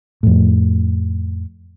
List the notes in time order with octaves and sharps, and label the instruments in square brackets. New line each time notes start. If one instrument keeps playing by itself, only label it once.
[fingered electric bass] F2 A2